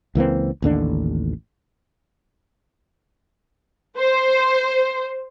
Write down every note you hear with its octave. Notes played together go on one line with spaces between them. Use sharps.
C#2 E3 A#3 C4
A1 D#2 D3 D4
C5